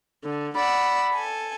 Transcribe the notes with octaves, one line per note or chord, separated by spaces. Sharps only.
D3
D5 F#5 B5 E6
A4 G#5